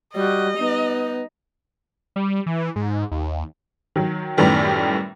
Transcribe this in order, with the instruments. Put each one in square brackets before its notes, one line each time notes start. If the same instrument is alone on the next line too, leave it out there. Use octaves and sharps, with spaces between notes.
[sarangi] G3 [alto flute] F#4 [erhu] D#5
[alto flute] B3 [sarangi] D#4
[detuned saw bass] G3
E3
G#2
D#2
[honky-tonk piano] D#3 F#3
F#2 A2 D#3 G3 B3